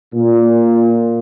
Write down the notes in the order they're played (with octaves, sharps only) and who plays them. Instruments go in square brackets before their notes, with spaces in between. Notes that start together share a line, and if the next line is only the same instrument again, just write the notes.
[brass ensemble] A#2